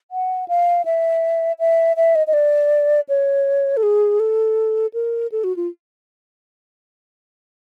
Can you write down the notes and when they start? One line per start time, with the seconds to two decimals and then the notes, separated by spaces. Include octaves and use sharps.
0.11 F#5
0.48 F5
0.85 E5
1.59 E5
1.96 E5
2.15 D#5
2.27 D#5
2.34 D5
3.09 C#5
3.77 A4
3.83 G#4
4.20 A4
4.94 A#4
5.32 A4
5.44 F#4
5.56 F4